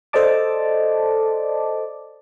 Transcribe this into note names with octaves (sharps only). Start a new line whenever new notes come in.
A4 C5 D5 D#5 A5 D6